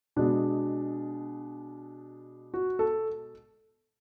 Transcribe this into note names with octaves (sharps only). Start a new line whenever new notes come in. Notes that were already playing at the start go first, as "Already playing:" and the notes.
B2 G#3 B3 D4
F#4
A4